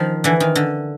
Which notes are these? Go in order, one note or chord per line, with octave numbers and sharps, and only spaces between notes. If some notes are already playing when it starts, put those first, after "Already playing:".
Already playing: D#3 F3
D3 E3
D#3
D3